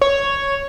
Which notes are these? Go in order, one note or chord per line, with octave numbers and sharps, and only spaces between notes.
C#5